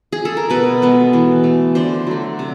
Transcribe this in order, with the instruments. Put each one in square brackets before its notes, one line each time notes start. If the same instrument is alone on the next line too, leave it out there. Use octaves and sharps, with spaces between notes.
[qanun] G#4
A4
A#4
B2 A4 B4
G#3 B3
E3
A3
D3 C5 D5
F#3 A3
C3